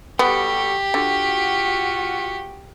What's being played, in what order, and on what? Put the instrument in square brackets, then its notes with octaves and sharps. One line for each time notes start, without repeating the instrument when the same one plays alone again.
[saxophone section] G3 F#4 A4 [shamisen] B3 [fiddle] G4
[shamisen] D3 [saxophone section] F4 F#4